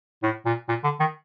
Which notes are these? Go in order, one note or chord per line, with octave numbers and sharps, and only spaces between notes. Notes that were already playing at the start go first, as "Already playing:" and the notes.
A2
A#2
A#2
D3
D#3